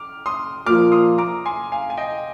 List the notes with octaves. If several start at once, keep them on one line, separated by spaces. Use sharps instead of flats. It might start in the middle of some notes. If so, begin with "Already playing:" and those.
Already playing: D6 F6
C6 D#6
A#2 F3 A#3 F4 D6 F6
C6 D#6
A#5 D6
G#5 C6
F5 G#5
G#5
D#5 G5